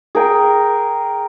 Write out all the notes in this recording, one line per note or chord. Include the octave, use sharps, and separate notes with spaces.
G#4 A#4 G5